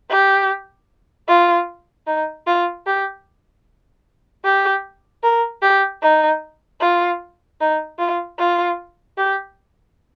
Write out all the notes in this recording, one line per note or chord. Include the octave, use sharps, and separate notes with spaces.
G4
F4
D#4
F4
G4
G4
A#4
G4
D#4
F4
D#4
F4
F4
G4